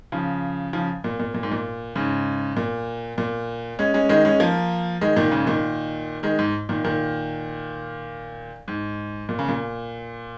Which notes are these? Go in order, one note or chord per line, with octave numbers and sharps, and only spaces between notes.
C#3 F3
C#3 F3
A#2
A#2
A#2
G#2
A#2
G#2 C#3
A#2
A#2
G#3 C#4
G#3 C#4
D#3 G#3
G#3 C#4
F3 A#3
D#3 G#3
A#2 D#3
G#2 C#3
A#2 D#3
D#3 G#3
G#2
A#2 D#3
A#2 D#3
G#2
A#2
C#3
A#2